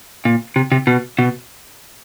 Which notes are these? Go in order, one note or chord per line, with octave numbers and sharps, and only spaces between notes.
A#2
C3
C3
B2
B2